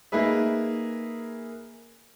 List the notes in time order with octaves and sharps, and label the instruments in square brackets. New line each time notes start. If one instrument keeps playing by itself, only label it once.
[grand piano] A#3 D#4 G#4 B4 E5